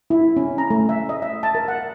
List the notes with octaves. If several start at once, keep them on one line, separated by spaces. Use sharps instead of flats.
E4
C#4
A#5
A3
E5
D#5
E5
A5
A#4
F#5